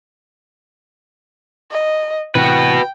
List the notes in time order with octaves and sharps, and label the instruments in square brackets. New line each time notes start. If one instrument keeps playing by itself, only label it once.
[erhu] D#5
[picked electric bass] A2 C3 E3 [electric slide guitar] F#4 B4 [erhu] G5